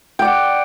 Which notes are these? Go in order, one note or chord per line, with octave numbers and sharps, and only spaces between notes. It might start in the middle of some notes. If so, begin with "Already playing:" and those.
D5 F#5 G5